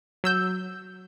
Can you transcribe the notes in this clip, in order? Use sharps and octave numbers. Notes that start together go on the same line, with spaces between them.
F#3 E6 G6